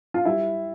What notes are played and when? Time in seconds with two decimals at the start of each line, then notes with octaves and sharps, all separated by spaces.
0.14 F4
0.25 G3 E4